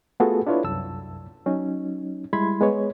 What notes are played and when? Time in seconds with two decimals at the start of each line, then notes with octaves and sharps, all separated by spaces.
0.20 A3 B3 F4 F#4 G#4 A4
0.47 D4 E4 F4 B4 C#5
0.64 C2 F#2 A5 E6
1.46 F#3 C#4 D#4
2.33 G3 G#3 E4 B5 C6 G#6
2.61 G#3 B3 B4 C#5